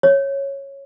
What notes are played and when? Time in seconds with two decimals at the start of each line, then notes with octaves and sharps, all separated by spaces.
0.03 C#5